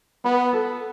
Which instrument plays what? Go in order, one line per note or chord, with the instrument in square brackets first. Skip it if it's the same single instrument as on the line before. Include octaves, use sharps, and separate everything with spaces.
[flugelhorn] B3 [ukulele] B5
[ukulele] A4